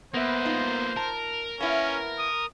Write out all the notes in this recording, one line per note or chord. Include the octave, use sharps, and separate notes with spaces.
A#3 B3 B4 C5 E5
D#4 F4
A#4 A5
A#3 B3 C#4 E4
D#6